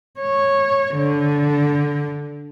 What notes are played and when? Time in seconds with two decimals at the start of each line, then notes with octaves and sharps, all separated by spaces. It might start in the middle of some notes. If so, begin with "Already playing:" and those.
0.20 C#5
0.95 D3